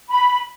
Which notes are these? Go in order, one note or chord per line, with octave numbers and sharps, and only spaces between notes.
B5